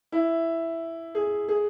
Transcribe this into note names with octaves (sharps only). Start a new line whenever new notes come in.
E4
G#4
G#4